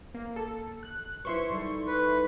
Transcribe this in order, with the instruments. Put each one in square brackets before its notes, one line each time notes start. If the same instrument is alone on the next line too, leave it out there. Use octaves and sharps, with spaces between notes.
[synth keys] A#3
A4
F#6
[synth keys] E4 C6 C#6 [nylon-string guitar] B4 C5 E5
[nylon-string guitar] G3 D#4 A4
[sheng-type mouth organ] B4